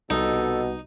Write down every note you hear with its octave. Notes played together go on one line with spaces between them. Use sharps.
C2 B2 D#4 A4